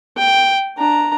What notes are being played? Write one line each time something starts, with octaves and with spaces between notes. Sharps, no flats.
G5
D4 A#5